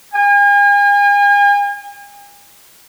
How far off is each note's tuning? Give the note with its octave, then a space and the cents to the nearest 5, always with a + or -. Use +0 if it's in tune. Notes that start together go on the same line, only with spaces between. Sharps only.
G#5 -40